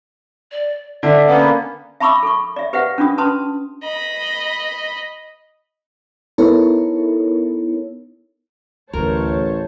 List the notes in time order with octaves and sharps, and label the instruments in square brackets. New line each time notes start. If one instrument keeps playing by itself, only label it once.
[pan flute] D5
[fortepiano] D3 [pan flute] E5
[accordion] A#3 B3 [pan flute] C#4
[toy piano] E5 A5 B5 C#6 D6 E6
A4 C#6
D5 E5
G4 B4 C5 E5 F#5
C#4 D4 F4 D#6
C#4 B4 A5 C6 D#6
[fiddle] D#5 B5
[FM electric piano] B3 D#4 E4 A4 A#4 C#5
[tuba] A1 [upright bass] D2 [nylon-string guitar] A#4 [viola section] C5 C#5 A5